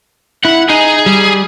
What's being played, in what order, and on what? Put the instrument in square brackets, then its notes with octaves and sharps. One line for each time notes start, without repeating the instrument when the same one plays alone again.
[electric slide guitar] E4 [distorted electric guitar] F#5
[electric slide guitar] D#4 [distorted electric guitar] G#4
[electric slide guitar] G3